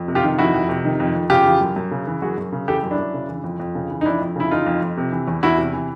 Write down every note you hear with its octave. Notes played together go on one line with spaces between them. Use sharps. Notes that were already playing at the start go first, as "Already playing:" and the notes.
Already playing: F2
C3
F4 G4
D#3
F2 E4 F#4
F2
C3
D#3
F2
F2
C#3 F4 G4
E3
F#2
F#2
C#3
E3
F#2 F#4 G#4
F#2
C#3
E3 G4 A4
F#2
D4 E4
F#2
C#3
E3
F2
F2
C#3
E3
D#4
F2 D4 E4
F2
C#3 E4
E3 D#4 F4
F2
F2
C3
E3
E2
E2 E4 F#4
C3
E3